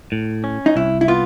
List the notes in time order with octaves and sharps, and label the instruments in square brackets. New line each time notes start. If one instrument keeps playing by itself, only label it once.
[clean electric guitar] A2
C#4
[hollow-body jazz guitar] D#4
[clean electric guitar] C2 [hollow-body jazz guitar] E4
[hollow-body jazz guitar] E4
[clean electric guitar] B3 [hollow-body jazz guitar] F4